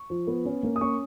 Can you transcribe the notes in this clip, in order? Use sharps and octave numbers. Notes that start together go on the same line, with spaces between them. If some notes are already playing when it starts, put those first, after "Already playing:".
Already playing: C#6
F3
B3
C#4
A#3
D#6
C#4 C#6